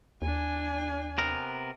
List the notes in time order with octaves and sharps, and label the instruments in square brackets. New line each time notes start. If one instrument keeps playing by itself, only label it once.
[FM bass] D#2 [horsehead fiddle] D4 G#5
[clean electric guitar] C3 B3 A#4